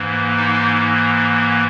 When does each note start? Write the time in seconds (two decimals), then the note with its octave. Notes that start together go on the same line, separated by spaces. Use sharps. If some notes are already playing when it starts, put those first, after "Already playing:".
Already playing: G#2 E3 A#3
0.37 D#4